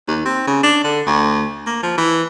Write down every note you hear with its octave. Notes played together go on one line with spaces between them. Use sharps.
D#2
C4
C#3
D4
D3
D2
A#3
F3
E3